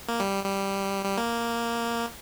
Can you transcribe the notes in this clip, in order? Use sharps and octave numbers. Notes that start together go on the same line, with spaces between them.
A#3
G3
G3
G3
A#3